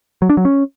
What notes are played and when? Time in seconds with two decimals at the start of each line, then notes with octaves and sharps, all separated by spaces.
0.22 F#3
0.30 D4
0.37 F#3
0.45 C#4